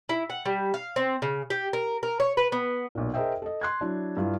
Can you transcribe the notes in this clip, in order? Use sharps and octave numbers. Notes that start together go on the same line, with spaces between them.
E4
F#5
G3
F5
C4
C#3
G4
A#4
A#4
C#5
B4
B3
B1 A#2
G#4 A#4 C5 D#5 E5 G5
A4 D#5
C6 F#6 G#6
F#3 D4 E4
G2 E4 F4